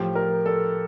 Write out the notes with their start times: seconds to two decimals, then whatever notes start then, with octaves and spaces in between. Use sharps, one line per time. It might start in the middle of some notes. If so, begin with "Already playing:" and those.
Already playing: A2 F3 G4
0.15 A#4
0.46 A4